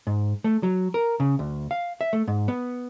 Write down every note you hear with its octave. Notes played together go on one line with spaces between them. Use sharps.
G#2
A3
F#3
A#4
C#3
D2
F5
E5
A3
G#2
B3